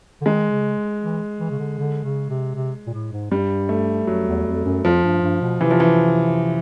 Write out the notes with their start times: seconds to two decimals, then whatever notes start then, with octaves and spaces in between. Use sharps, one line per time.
0.21 D3
0.25 D#3 G#3
0.51 C#3
1.02 E3
1.40 E3
1.51 C#3
1.59 D3
1.78 D3
2.04 C#3
2.30 C3
2.55 C3
2.87 A#2
2.94 A2
3.12 G#2
3.31 G2 G3
3.69 A3
4.07 F#2 F#3
4.27 E2
4.46 F2
4.65 F#2
4.84 F2 F3
5.03 G2
5.22 G2
5.42 B2
5.61 C3 E3
5.71 F3
5.80 E3